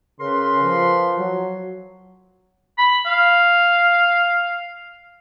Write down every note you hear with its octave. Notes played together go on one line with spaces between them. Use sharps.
C#3 A#4 B4 C6
F3
F#3
B5
F5